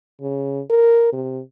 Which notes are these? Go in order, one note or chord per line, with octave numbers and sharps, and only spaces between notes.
C#3
A#4
C3